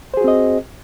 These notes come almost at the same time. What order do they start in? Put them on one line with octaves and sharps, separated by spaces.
C5 G#4 F#4 C4 D#5